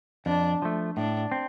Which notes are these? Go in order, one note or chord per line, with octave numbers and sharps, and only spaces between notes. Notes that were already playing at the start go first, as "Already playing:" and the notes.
F2 D4
F3 A3
A2 D4
C4